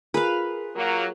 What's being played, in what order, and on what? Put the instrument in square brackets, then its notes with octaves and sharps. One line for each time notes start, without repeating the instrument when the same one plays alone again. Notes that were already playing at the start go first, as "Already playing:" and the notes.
[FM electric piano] F4 G#4 A#4 [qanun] B4 F5
[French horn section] F#3 A#3